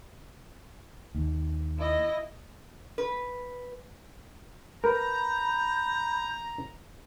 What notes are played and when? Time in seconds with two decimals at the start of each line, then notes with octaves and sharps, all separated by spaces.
1.15 D#2
1.79 E4 D#5
2.98 B4
4.84 A#4 B4 A#5 B5 G6